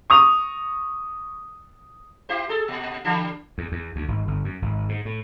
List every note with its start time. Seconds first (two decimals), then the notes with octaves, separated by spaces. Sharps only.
0.10 C#6 D#6 F7
2.29 E4 G4 C5
2.49 G#4 A4
2.68 A#2
3.05 D3 E3 G3
3.58 E2
3.72 E2
3.96 D2
4.08 G#1
4.28 G1
4.44 F#2
4.62 G#1
4.89 G#2
5.05 A2